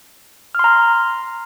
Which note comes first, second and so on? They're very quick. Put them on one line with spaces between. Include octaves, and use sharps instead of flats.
F6 C6 A#5